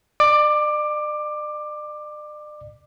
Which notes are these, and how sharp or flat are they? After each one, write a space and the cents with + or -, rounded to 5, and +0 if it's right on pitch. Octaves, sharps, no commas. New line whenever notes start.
D5 +40 D6 +15